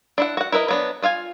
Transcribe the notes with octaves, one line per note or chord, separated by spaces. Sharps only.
D4 E4 F#5
F#4 F#5
E4 A#4 B4 D#5
F#3 B3 D4
D4 F4 F5 G#5